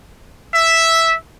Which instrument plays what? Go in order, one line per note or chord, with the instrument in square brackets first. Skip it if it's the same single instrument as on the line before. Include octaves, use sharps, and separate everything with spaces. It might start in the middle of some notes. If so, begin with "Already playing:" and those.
[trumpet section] E5